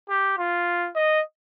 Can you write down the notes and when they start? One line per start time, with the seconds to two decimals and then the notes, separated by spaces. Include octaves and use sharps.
0.09 G4
0.38 F4
0.95 D#5